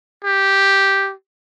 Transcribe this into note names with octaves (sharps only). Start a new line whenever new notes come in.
G4